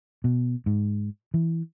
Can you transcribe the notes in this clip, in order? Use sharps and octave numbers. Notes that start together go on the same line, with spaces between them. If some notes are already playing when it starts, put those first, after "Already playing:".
B2
G#2
E3